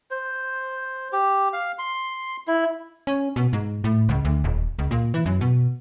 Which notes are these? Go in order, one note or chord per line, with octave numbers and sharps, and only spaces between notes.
C5
G4
F5
C6
E4
C#4
B2
G#2
A2
C#2
D2
D#1
C#2
A#2
E3
F#2
B2